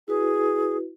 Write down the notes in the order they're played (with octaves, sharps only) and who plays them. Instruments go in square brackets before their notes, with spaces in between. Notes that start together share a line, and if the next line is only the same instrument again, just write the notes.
[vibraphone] E4 F#4 B4 [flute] G#4